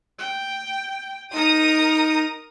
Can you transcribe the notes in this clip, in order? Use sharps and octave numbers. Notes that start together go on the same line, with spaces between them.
G5
D#4 A#4 A#5 D#6